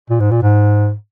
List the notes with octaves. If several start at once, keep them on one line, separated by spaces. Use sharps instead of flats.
A#2
G#2
A#2
G#2